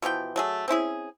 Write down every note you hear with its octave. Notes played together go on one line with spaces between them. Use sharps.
B2 E3 F3 G5
F#3 A3 G#4
C4 C#4 E4 G#4